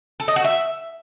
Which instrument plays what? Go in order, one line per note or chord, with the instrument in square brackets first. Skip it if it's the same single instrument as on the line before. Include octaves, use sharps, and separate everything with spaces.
[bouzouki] A4
D#5
F#4
E5